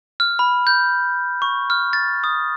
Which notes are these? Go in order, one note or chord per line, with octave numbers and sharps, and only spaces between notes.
F6
B5
G6
C#6
F6
A6
D#6